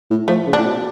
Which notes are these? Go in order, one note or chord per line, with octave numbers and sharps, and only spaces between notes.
A2
F3 A3
C#3
D4
A2
B2